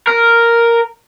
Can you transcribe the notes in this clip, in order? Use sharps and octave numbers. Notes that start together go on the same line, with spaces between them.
A#4